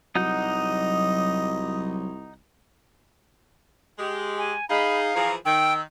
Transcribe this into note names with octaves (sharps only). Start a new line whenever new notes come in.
C2 F#3 D#4 D#5 F#5 G6
G#3 G4
G#5
D#4 G#4 F5 B5
E3 F3 G#4 A#5
D#3 G5 E6